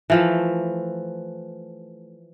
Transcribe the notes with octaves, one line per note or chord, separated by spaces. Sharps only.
E3 F3 A3